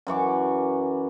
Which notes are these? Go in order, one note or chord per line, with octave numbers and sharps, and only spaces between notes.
F#2 E3 C#6 D6